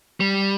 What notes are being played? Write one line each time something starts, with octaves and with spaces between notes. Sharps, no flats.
G3